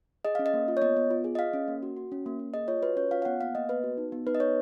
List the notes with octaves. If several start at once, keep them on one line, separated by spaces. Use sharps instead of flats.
G#4 D#5
C#4 F5
D#5
A#3
F4
C#5
B3 D#5
B3
F4
G#4
D#5
G#4 F5
C#4
A#3
F#4
F#4
C#4
A#3
A#3
G#4 D#5
F4 C#5
F#4 B4
C#4 C#5
F4 F5
F5
B3 F#5
A#3 F5
A#3 D#5
B3 B4
F#4
D#4
B3
D#4 B4
D#5
B3 C#5